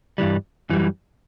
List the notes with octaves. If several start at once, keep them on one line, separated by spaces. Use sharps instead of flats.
G2 E3 G3
F#2 E3 G3